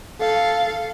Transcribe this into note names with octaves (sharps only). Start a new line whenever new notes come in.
A4 F5